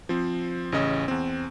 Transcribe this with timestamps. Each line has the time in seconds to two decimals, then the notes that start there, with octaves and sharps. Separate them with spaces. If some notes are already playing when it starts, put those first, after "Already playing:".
0.09 F3 C4
0.72 A1 C#3 C#4 D#5
1.08 E2 C4